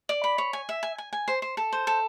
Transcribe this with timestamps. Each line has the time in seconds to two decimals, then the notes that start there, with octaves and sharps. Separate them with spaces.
0.09 D5
0.24 B5
0.38 C#5
0.53 G#5
0.69 E5
0.83 G#5
0.98 G#5
1.13 G#5
1.28 C5
1.42 C5
1.57 A4
1.73 C5
1.87 A4